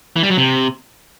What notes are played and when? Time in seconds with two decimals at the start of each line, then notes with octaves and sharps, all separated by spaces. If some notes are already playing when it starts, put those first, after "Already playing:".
0.16 E3
0.23 G3
0.30 F#3
0.38 C3